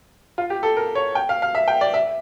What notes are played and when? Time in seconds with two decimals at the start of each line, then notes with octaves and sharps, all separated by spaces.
0.38 F4
0.50 G4
0.63 A4
0.77 A#4
0.95 C#5
1.15 G5
1.29 F5
1.42 F5
1.55 E5
1.68 G5
1.81 D5
1.94 E5